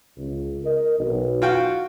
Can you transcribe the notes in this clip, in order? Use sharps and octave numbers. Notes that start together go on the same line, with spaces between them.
C#2
A#4 D#5
B1
F4 F#4 G5